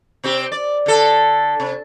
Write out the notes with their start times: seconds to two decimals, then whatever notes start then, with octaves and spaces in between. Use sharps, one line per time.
0.24 C3 C4 G4
0.52 D5
0.86 D3 A4
1.60 C3